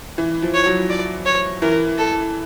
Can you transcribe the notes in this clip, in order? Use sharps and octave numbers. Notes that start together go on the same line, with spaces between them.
E3
F3
C#5
F#3
D5
C#5
E3 A#4
A4